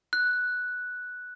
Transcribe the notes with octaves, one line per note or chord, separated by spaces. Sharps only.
F#6